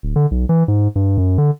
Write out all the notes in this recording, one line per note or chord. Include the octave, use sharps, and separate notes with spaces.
D1
D3
B1
E3
G#2
G2
F#2
D3